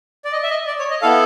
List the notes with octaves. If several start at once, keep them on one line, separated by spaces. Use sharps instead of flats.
D5
D#5
E5
D#5
D5
C#5
D#5
B3 E4 A4 F5